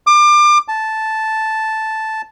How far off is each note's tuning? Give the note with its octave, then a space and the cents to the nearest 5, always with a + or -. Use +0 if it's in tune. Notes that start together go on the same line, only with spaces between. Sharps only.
D6 +30
A5 -5